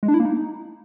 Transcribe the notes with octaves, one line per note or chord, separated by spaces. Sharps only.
G#3
D4
E4
A#3
D#4